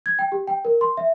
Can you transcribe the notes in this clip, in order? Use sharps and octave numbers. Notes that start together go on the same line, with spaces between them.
G#6
G5
G4
G5
A#4
C6
E5